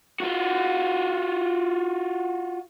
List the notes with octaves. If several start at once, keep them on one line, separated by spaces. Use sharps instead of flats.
F4 F#4